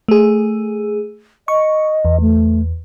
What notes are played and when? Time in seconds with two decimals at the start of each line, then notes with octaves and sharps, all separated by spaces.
0.08 A3 G#4
1.48 D#5 C#6
2.05 E2
2.21 A3